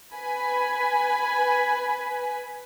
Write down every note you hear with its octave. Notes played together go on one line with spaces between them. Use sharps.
B4 G#5 B5